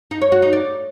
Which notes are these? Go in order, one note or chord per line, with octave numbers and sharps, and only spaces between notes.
D#4
C#5
F#4
D#4
D5